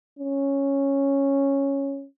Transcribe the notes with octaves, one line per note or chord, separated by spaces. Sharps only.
C#4